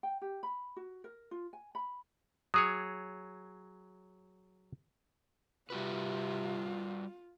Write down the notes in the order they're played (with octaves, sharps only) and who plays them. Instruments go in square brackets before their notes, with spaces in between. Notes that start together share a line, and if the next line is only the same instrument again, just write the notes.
[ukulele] G5
G4
B5
F#4
A#4
F4
G#5
B5
[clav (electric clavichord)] F#3 G#4 C#5 [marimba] D#6
[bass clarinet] C3 [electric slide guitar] G3 F#4 B4 [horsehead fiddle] F4